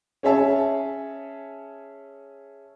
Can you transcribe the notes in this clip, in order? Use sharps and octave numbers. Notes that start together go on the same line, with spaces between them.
C#4 G#4 C#5 E5 A5